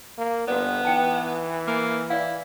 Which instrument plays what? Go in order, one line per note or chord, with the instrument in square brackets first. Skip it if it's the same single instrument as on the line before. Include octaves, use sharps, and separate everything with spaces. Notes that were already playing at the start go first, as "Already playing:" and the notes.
[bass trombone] A#3
[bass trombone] G1 [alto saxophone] B3 [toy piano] F#4 B4 D5
[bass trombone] E3 [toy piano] D#4 G5 A5
[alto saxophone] A#3
[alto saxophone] E4 [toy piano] D5 F5